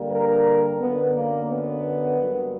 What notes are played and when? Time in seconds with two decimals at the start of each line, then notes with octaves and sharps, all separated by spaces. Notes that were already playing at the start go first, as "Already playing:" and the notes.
Already playing: G2 D3 G3 A#3
0.10 A#4
0.79 F#2 D3 A#3 B3
1.13 A#3
1.48 B3
2.16 G2 F#3 A#3